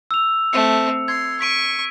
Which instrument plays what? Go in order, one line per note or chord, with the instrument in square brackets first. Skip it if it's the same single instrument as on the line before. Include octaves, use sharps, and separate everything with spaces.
[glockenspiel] E6 F7
[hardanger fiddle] A3 C4 [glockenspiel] C#7
[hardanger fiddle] C6 [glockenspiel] G#6
[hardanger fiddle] C#6 [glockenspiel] B6 D7 D#7